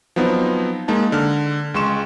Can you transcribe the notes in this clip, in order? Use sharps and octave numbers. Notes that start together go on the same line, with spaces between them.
F3 F#3 B3 C4 D#4
G#3 A#3 D#4 A5
D3 F6
C#2 G#3 C6 C#6 E7